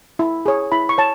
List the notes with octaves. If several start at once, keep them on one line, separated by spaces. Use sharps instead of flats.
E4
G#4 C#5
E4 B5
C#6
C#5 A5